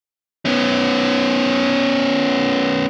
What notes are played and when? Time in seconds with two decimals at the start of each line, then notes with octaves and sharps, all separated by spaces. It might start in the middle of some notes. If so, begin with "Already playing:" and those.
0.45 B3 C#4